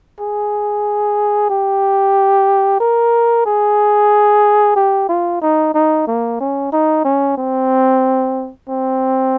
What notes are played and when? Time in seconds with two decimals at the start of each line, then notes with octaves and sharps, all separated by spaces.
0.20 G#4
1.50 G4
2.80 A#4
3.45 G#4
4.76 G4
5.09 F4
5.41 D#4
5.74 D#4
6.07 A#3
6.40 C#4
6.72 D#4
7.05 C#4
7.37 C4
8.68 C4